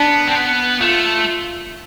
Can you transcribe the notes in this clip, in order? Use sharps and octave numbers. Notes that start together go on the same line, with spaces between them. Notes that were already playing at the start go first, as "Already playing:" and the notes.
Already playing: B3 D4
C4
B3
A3 F4